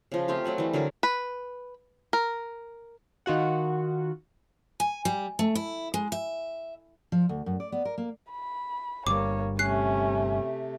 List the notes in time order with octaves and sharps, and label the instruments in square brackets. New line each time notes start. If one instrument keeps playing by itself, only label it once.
[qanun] C#3 F3
A3 C4 F4 G4
F#3 A3 F#5 G#5
E3 G3
D3 F#3 G#4 A#4
[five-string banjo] B4
A#4
[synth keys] D#3 F4 F#4 F#5
[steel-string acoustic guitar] G#5
G3
A3
E4
G#3
E5
F3
D2
F#2
D5
B3
A#4
A#3
[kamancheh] B5
[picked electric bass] G1 G2 G3 [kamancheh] A#3 C#5 [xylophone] D6
[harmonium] C3 A3 [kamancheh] C#4 [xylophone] F#6 C7